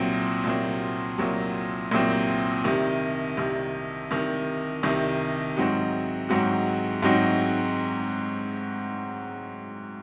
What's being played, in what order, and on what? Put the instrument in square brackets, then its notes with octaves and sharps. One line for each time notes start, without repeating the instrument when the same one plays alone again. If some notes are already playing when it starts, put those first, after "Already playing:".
Already playing: [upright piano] C2 A#2 F#3 C4
C2 A#2 F#3 C4
C2 A#2 F#3 C4
C2 A#2 F#3 C4
C2 C3 D#3
C2 C3 D#3
C2 C3 D#3
C2 C3 D#3
G#2 F#3 C4 D#4 F#4
G#2 F#3 C4 D#4 F#4
G#2 F#3 C4 D#4 F#4